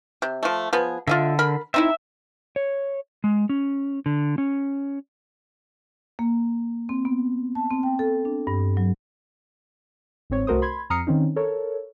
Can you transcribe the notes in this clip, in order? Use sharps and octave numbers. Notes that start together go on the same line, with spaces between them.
C3
F3 A3
F3 B3 G#4
D3 F4 D#5 E5
A#4 B5
C4 D#4 E4 E5
C#5
G#3
C#4
D3
C#4
A#3
C4
B3
A5
C4
G5
A4
D4
G2
F#3
G1 G#2 C4 C#5
C2 A3 F#4 A#4 C5 D#6
B5 C6 G#6
F2 A#5 D#6 F6 C7 C#7
D#3 C4 C#4 D#4
A4 A#4 C#5